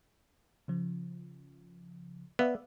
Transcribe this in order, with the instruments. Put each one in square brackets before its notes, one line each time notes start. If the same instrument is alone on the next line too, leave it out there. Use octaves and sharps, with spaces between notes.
[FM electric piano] C#3 F3
[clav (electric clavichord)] B3 [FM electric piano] D5 E5 F5